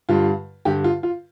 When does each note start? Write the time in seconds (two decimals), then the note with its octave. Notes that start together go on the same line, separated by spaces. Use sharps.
0.09 G2 D3 G3 F4
0.65 G2 D3 G3 G4
0.84 F4
1.03 F4